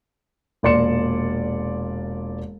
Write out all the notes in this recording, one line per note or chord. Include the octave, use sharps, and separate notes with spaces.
E1 A#2 D5 C6 C#7 E7